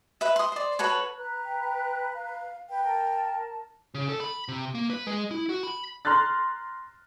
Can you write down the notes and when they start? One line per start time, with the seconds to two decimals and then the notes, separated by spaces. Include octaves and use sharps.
0.21 B4 E5
0.36 C6 D#6
0.52 C5 D5
0.79 F#4 A4 B4 C#5
1.18 B4 A#5 F#6
1.45 G5
1.61 G5
2.14 F5
2.70 B4 G5
2.84 A#4 A5
3.94 C#3
4.09 A4
4.20 B5
4.48 C3
4.75 A#3
4.90 B4
5.07 G#3
5.31 E4
5.49 F#4
5.63 B5
6.05 A#5 C6 F6 F#6 A6